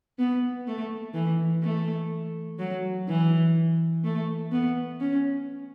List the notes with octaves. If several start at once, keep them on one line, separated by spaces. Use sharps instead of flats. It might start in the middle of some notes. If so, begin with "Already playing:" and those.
B3
A3
E3
A3
F#3
E3
A3
B3
C#4